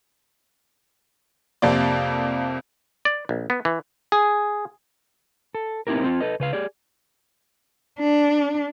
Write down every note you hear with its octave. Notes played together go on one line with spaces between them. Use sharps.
F2 C3 A#3 D5
D5
A#1
B3
E3
G#4
A4
B3 C4 D#4 E4 G4 A#4
C4 F4
A4 B4 D#5
C#3 B4 F5
G4 G#4 D5
D4